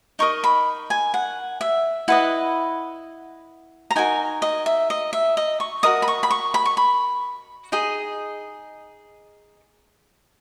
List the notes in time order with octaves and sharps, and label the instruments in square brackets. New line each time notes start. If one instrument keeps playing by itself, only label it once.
[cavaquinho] D#4 A#4 D#5 C#6
B5
G#5
F#5
E5
E4 B4 D#5 F#5
A#5
D#4 F#4 A#4 G#5
D#5
E5
D#5
E5
D#5
C#6
F#4 A#4 D#5 D#6
B5
C#6
B5
C#6
B5
C#6
B5
D#4 G#4 D#5